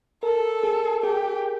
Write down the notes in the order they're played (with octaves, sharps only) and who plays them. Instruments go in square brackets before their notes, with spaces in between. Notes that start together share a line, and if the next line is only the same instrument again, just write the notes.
[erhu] A4 [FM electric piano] A#4
[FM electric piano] G#4
[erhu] G4 [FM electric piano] G#4